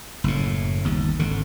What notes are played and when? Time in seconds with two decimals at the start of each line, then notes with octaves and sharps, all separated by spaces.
0.24 F#1 A2
0.84 G1 D#2
1.19 G#1 D3